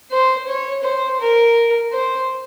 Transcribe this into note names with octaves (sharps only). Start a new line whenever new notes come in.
C5
C#5
C5
A#4
C5